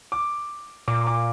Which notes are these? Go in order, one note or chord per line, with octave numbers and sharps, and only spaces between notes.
D6
A#2 D6
D6